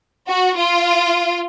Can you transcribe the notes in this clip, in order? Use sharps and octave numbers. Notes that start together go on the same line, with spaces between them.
F#4
F4